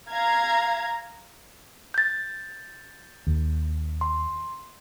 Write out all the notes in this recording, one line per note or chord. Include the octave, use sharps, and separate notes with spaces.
F5 A#5 G#6
G6 A6
D#2
C6